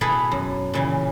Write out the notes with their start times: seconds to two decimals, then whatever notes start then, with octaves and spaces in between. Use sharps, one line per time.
0.01 B2 E4 G#4 A4 B4
0.31 F#2
0.74 A#2 C#3 E3